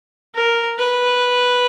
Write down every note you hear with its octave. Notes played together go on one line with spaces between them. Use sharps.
A#4
B4